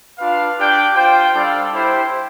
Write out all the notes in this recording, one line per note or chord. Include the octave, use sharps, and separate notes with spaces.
D4 F4 B4 F5
D4 G4 D5 G5
F4 C5 G5
G3 D4 A4 D5 F5
E4 G4 C5 G5